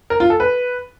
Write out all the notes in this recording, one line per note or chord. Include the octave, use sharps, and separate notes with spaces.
A#4
F4
A4
B4